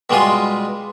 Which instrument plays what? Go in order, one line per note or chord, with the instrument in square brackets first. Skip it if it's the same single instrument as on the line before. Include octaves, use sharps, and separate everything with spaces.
[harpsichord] B2 G3 G#3 F4 D#6